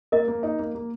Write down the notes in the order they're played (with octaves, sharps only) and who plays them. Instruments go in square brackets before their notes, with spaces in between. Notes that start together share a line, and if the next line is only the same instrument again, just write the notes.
[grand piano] A#3 [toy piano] A#4 D#5
[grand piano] A#3
D#4
A#3
A#3